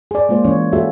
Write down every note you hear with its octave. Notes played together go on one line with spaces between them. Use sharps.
G#4 D5
G#3 A#3 F4 C5
E3 C#4 C#5
A3 F4 F#4 G#4 A4 E5